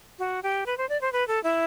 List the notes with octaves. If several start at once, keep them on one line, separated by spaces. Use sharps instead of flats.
F#4
G4
B4
C5
D5
C5
B4
A4
E4